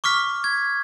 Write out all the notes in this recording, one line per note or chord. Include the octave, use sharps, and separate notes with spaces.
C#6 D6 F6 B6
G#6